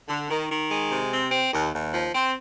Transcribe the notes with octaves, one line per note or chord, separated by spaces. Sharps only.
D3
D#3
D#3
G#3
C3
C4
C4
D#2
D#2
F3
C4